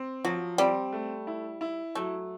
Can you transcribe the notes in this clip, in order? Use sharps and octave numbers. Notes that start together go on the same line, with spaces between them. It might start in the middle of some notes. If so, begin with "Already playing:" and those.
Already playing: C4
F3 F#3
G3 C4
A3
E4
E4
F#3 A3